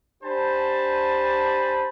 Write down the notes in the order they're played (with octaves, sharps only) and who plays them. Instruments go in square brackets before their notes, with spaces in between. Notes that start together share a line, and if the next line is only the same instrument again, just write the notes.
[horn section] D4 G4 C5 G#5 A5 B5